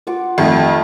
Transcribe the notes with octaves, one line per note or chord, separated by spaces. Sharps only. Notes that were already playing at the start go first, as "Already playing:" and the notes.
F4 F#5 D6
F2 D#3 G3 A3